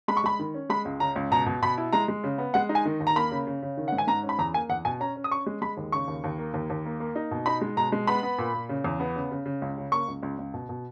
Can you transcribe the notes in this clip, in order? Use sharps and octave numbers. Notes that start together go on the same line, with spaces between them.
G#3 B5
C#6
G#3 B5
D#3
C#4
G#3 B5
C#2
C#3 A#5
C#2
B2 A#5
B2
B2 B5
E4
G#3 A#5
G#3
C#3
B3
G#3 F#5
D#4
G#5
D#3
D#2
A#5
A#3 B5
C#3
C#3
C#3
D#3
G#2 F#5
G#5
G#2 A#5
C#4
B5
E2 A#5
A#3 G#5
E2 F#5
B2 G#5
C#4 A#5
C#4
D#6
C#4 C#6
G#3
G#3 B5
D#2
C#3 C#6
D#2
D#2
A#3
D#2
D#2
A#3
A#3
D#4
B2
D#4 B5
G#3
B2 A#5
G#3
B3 B5
B3
A#2
A#2
C#3
E2
B3
C#3
C#3
C#3
C#2
C#3
A#3 C#6
C#2
C#2
C#2
B2
B2